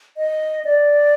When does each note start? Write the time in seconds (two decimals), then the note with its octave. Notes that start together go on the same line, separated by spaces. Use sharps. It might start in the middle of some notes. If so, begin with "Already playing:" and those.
0.17 D#5
0.65 D5